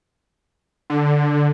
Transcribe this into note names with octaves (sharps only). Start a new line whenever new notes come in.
D3